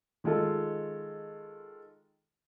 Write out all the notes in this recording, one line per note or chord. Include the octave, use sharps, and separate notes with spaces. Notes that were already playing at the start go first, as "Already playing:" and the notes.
D#3 G#3 F4 A4